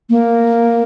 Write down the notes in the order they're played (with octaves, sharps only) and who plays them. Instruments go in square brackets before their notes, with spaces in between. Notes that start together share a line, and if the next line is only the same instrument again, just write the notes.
[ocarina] A#3